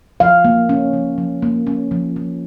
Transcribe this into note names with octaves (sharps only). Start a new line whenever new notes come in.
F3 F5
A#3
C#4
F3
F3
A#3
C#4
F3
F3